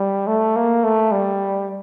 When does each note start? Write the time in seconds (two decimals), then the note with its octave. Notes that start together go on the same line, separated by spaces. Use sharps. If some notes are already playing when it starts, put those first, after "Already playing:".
Already playing: G3
0.27 A3
0.56 A#3
0.84 A3
1.12 G3